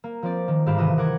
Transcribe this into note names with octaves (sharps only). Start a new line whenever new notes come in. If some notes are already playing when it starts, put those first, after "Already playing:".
A#3
F3 C4 D5
D#3
G1 G#2 G4 F5 B5 E7
G2 C3 D#3 E3 D#5 E7
A#4 F#5 C6 D6 G#6 A#6